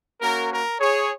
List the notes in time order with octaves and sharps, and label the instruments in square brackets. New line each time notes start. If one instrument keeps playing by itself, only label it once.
[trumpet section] A#3 C#4 F#4 A#4
A#4
G#4 C#5